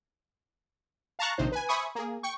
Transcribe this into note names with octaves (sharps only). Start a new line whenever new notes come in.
F5 A5 A#5 C#6 F#6
A#1 C3 D#3 D#4 C5
B4 G#5
C5 E5 G#5 B5 C#6 D#6
A#3 G#4
G5 C#6